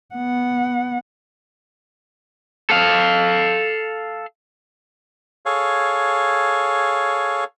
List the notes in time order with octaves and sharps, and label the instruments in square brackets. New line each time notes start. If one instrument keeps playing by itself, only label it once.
[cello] B3 F#5
[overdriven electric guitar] A4 F5
[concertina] G#4 A4 C#5 F5